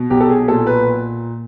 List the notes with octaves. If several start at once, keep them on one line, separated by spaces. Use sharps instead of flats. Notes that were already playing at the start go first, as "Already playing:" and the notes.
Already playing: B2
B1 G4
A4
G#4
A#2 A4
B4